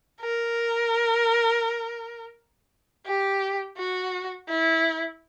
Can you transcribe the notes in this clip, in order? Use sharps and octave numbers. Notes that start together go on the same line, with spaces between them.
A#4
G4
F#4
E4